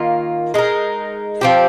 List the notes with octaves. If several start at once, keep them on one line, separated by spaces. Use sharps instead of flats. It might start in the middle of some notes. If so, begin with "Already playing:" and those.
Already playing: D#3 A#3 F4
G#3 D#4 A#4
F3 C4 G4